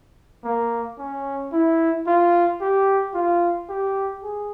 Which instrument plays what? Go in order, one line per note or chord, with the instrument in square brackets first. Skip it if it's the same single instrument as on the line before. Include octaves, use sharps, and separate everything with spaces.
[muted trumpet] A#3
C#4
E4
F4
G4
F4
G4
G#4